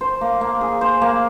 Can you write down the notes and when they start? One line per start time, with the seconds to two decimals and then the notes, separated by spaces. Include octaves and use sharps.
0.01 C5
0.21 A#3
0.41 A#3
0.61 G#4
0.81 C5
1.02 A#3